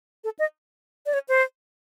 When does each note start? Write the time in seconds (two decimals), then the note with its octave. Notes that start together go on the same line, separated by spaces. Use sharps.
0.24 A4
0.39 D#5
1.06 D5
1.13 C#5
1.29 C5